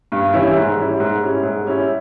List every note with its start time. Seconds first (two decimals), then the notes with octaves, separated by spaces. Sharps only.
0.12 G2
0.33 E3 G3 C#4 E4
0.56 G#2
0.78 G3 C#4 E4
1.00 G#2
1.22 G3 C#4 E4
1.43 G#2
1.65 G3 C#4 E4